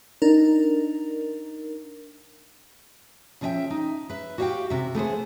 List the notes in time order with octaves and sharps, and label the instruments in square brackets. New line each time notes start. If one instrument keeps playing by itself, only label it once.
[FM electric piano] D4 D#4 A#4
[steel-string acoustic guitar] C#3 F3 A4 D#5 E5 G5
D#4
B4 E5
F#4 G4 C#5 E5 F5 G5
C3 E5
A3 B3 G#4 C5